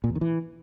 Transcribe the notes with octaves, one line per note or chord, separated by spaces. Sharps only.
A#2
E2
D#3
E3